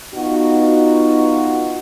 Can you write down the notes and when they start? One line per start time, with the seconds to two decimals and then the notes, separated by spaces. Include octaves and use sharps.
0.14 B3 D#4 F4 F#4